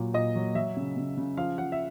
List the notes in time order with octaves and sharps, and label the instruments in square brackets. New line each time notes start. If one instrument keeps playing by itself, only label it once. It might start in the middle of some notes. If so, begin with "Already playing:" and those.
Already playing: [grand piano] A#2 F#3
A#2 D#5
F#3
F#3 E5
C#3
C#3
C#3
F3 F5
F3 F#5
E5